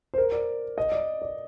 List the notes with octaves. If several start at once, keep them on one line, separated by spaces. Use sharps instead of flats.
C5
A#4
D5
D#5
D5
D5